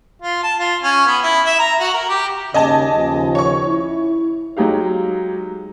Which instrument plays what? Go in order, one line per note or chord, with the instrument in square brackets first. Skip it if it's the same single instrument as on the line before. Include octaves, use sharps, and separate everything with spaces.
[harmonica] F4
A5
F4
C#4
B3
E4
E5
A#5
F#4
A#4
G4
[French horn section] D#2 C#3 [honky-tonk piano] D#5 G#5 A5
[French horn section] D#2 C#3 F3
[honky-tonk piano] C#5 C#6
[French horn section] E4
[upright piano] F#3 G#3 D#4 G4 F5